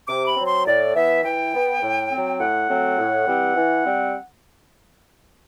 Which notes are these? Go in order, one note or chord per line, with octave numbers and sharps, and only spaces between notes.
C3 D6
B5
F#3 C4
C6
A2 D5
E3 B3 E5
E3 G5
B3
A2
F#3 C4
A2 F#5
F#3 A3 C4
A2
E3 G3 C4
E3
G3 C4